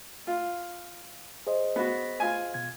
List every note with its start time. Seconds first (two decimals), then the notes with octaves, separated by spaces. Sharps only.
0.27 F4
1.47 G#4 C5 D#5
1.76 B3 F#4
2.20 F4 G#5
2.54 B2 G#6